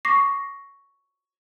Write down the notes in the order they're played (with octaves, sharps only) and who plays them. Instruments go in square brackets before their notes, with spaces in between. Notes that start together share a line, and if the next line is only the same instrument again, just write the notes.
[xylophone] C#6 D6 A#6 C7